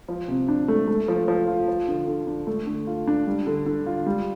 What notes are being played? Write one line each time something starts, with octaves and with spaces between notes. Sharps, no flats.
F3
C3
D4
A3
A3
F3
F3
F4
F3
D3
D3
D4
A3
D3
F4
D4
G3
D3
D3
F4
G3